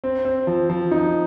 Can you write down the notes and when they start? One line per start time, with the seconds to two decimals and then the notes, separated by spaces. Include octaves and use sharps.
0.04 C4
0.25 C4
0.47 F3
0.70 F3
0.91 D#4